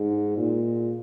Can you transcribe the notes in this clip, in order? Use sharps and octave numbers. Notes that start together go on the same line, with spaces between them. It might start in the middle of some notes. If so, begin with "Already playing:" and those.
Already playing: G#2
A#2